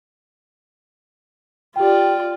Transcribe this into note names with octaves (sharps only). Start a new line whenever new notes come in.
F4 G4 D5 G5